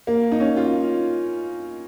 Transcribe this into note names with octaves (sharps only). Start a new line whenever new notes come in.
A#3
D#4
C#4
F4